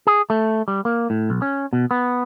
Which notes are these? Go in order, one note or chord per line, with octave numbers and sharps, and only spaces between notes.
G#4
A3
G3
A#3
A2
B1
C#4
B2
B3